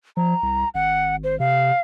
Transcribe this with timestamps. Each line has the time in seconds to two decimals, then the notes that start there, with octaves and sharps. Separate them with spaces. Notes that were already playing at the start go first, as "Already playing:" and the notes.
0.17 F3 A#5
0.43 C2
0.74 G#1 F#5
1.24 C5
1.40 C3 F5